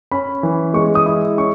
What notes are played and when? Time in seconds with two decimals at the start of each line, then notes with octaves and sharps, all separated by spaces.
0.12 C#4 B5
0.43 E3
0.74 G#3 C#6
0.95 D#6
1.06 E4
1.38 C#4 C#6